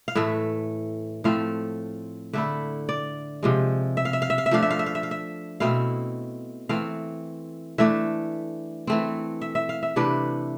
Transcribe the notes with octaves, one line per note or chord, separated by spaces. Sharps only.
F5
A2 E3 A3 E5
A2 F3 A3 C4 F5
D3 A3 E4 E5
D5
C3 F3 G#3
E5
F5
E5
F5
E5
F5
E5
F3 A3 D4 F5
E5
F5
E5
F5
E5
F5
E5
B2 A3 C4 E4 F5
E3 A3 C4 F5
E3 A3 D4 E5
E3 A3 C4
E5
E5
F5
E5
C3 E3 A3 D4 B4